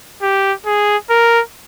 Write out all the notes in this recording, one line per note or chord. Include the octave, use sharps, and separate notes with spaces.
G4
G#4
A#4